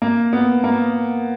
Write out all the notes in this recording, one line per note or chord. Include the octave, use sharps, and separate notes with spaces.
A#3
B3
A#3